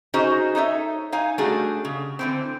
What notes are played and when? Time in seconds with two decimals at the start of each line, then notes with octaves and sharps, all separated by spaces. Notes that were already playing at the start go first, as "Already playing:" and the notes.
0.14 C#4 D#4 F#4 G#4 C5 D#5
0.55 D#4 A4 C#5 E5
1.12 D#4 C#5 F5 G#5
1.38 G3 A3 C#4 D4 F#4 G#4
1.85 C#3
2.19 D3 E3 C4